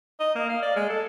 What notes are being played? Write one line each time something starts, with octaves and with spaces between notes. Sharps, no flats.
D#5
A#3
F5
D5
G#3
A4